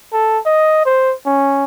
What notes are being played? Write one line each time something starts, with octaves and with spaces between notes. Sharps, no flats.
A4
D#5
C5
C#4